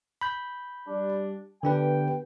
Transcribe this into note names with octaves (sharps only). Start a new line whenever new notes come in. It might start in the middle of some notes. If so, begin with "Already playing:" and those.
B5 G6
G3 D4
D3 B3 D4 G4 B4 G5